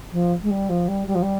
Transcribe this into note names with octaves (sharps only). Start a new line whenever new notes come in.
F3
G#3
G3
F3
G3
G3
F3
G3